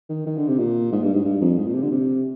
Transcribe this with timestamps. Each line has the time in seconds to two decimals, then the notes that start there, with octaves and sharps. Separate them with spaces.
0.09 D#3
0.26 D#3
0.37 D3
0.48 C3
0.59 A#2
0.92 G#2
1.03 G2
1.14 G#2
1.25 G2
1.41 F2
1.58 G#2
1.67 A#2
1.74 C3
1.82 D3
1.91 C3